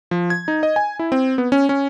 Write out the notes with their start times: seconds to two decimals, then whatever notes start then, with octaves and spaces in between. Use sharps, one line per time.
0.11 F3
0.30 G#6
0.48 D#4
0.63 D#5
0.76 G#5
0.99 E4
1.12 C4
1.38 B3
1.52 C#4
1.69 C#4